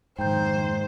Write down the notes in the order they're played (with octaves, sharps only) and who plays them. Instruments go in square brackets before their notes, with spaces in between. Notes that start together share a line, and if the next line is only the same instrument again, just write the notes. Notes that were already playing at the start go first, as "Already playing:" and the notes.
[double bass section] F#1 F2 D#3 [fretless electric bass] G#2 [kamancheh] C5 [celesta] G5 A#5 G6